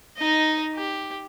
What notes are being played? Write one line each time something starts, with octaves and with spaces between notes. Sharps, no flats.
D#4 D#5
G4